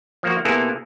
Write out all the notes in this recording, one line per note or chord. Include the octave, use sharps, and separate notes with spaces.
F3 A#3 F#4
C3 A#3 B3 E4 G#4 A4